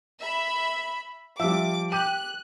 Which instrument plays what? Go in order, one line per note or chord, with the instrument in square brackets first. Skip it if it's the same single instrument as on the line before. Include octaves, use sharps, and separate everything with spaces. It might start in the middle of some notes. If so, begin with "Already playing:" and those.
[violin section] E5 B5
[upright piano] F3 G3 [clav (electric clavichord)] E5 [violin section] D6
[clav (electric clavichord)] G4 [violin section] F#6 [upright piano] D#7